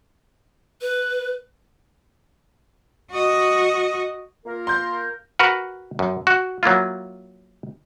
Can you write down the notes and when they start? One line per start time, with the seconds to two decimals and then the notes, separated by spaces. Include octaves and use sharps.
0.81 B4
3.11 F#4 D#5
4.46 A#3 F4 A#4
4.67 C6 G6
5.39 F#4 A#4 B4 F#5
5.99 F#2
6.27 F#4
6.63 F#3 A#3 E4 F4